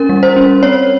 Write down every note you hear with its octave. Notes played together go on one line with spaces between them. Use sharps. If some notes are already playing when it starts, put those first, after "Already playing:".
Already playing: C#4 A#4
G3
C5
C#4
C4 C#5